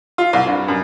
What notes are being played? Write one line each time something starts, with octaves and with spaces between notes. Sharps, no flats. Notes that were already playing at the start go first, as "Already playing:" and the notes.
F4
C2
G2
F#2